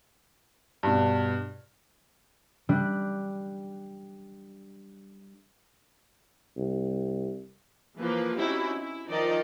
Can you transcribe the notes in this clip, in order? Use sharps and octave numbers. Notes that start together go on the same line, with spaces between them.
G2 B2
G3 D4 F#6
C2
E3 F3 A#3 B4
C4 C#4 D#4 E4 F#4 G4
E4
D#3 F3 D#4 D5 D#5